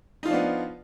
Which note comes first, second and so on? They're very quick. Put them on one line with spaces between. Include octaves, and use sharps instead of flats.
D#4 F4 F3 D4 B3